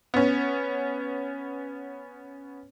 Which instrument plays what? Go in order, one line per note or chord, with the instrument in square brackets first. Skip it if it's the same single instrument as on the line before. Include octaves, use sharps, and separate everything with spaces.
[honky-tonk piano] B3 C#4